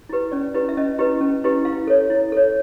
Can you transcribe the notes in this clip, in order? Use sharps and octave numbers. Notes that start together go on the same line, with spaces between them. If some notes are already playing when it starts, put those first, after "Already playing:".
E4 G4 B4
C#4 D5
E4 G4 B4
E5
C#4 D#5
E4 G4 B4
C#4
E4 G4 B4
E4 F5
A4 C#5
E4
A4 C#5